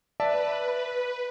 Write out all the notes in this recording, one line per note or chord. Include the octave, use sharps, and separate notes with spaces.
B4 D5 E5 A5